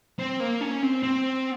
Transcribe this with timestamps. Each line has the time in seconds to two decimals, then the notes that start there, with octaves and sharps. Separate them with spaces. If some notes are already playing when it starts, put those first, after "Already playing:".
0.19 C4
0.40 A#3
0.61 C#4
0.82 C4
1.03 C4